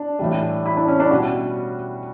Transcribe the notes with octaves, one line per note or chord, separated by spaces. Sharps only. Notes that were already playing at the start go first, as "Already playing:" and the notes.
Already playing: D4
A2 E3 G3
E4
D4
C#4
D4
B2 G3 F#4